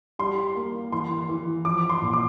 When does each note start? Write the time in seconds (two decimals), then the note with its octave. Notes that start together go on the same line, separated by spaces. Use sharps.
0.19 G3 C6
0.56 A#3
0.92 E3 C6
1.29 E3
1.65 F3 D6
1.90 C6
2.02 A#2
2.13 D6